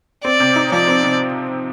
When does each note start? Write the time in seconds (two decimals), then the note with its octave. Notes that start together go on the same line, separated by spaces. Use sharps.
0.24 C4 D5
0.40 C3
0.56 D#4
0.72 F3 D5
0.88 C4
1.03 C3